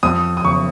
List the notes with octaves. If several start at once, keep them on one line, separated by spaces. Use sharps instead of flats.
F2 D#6
D#6
F#1 C#6